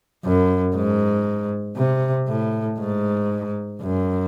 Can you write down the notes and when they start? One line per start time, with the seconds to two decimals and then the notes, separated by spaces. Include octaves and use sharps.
0.25 F#2
0.75 G#2
1.76 C3
2.28 A2
2.80 G#2
3.81 F#2